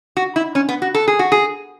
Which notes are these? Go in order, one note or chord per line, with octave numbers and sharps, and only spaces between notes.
F#4
E4
C#4
B3
F#4
A4
G#4
F#4
G#4